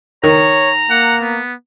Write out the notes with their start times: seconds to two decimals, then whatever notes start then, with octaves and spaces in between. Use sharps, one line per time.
0.24 D#3 C#5 A#5
0.90 A#3 F#5
1.21 B3